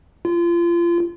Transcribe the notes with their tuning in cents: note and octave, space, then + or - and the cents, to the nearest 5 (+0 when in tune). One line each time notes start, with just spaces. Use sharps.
F4 -30